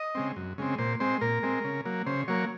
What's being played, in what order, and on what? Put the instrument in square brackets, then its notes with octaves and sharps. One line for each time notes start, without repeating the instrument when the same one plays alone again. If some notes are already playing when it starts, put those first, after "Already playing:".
Already playing: [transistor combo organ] D#5
C#3 G#3 C4
F#2
C#3 G#3 C4
A#2 C5
G#3 C4 C5
A#2 A#4
G#3 C4
C#3
F#3 A#3
C#3 C5
F#3 A#3 C#5